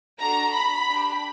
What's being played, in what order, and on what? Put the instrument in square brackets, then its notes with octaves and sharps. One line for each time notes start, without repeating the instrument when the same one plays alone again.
[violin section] D4 F#4 A4 A#5
B5
D4 G4